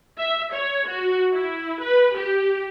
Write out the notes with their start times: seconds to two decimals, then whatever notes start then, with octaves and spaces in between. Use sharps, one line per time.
0.18 E5
0.52 C#5
0.87 F#4
1.33 E4
1.80 B4
2.16 G4